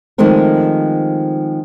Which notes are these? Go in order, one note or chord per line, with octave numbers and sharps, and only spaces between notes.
D#3 F3 G#3 A3 C4 A#4